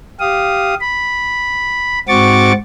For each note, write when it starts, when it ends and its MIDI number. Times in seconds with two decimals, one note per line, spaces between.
0.20 0.74 67
0.20 0.74 77
0.20 0.74 87
0.81 1.99 83
2.08 2.52 44
2.08 2.52 60
2.08 2.52 66
2.08 2.52 85
2.08 2.52 86
2.08 2.52 93